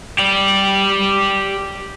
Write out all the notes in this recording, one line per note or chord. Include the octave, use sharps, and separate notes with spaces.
G4 D5